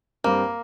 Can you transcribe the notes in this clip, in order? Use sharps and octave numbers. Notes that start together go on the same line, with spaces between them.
G2 G3 A#3 C4 A#4